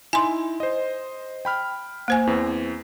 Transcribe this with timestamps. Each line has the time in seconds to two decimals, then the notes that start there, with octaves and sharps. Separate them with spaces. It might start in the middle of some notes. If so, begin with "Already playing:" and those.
0.13 D#4 E4 G#5 C6
0.60 C5 D#5
1.45 G5 B5 F6
2.08 A#3 C5 G#5
2.27 E2 E3 C4